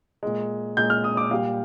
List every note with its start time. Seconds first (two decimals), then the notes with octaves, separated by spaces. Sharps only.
0.23 A#2 G#3
0.77 A#2 G#3 G6
0.90 F6
1.04 D#6
1.17 D6
1.31 A#2 G3 F5